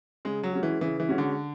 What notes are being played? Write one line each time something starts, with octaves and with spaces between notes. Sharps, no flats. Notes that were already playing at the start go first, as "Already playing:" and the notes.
C#3 G#3
F#3
G#3 C#4 F#4
E3
C#3 E3
E3
G#3 C#4 F#4
D3